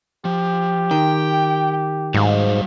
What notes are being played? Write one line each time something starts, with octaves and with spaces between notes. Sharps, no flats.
F3 G4
D#3 G5
G#2 F#3 G3 F5